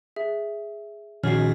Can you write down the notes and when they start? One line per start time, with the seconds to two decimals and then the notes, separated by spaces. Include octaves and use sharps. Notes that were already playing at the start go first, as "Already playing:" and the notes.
0.16 G#4 E5
1.24 A#2 D#3 F3 C#4 F#4 G#4 F6 C7